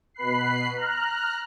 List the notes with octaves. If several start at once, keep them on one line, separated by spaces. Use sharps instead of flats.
B2 B4 B5 F#6 C7
A#5 F6 F#6